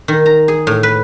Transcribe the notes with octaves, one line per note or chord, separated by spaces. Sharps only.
D#3
A#5
G#4
A2
B4